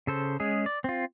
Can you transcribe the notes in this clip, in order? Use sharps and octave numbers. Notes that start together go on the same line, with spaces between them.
C#3 A4 C5
G#3 C#4 G#4
D5
C4 F4